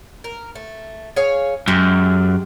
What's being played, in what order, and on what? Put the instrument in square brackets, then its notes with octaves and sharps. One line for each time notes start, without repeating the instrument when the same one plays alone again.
[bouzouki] A#4
A3
G#4 C#5 F5
[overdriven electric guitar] F#2 [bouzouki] G#3 G4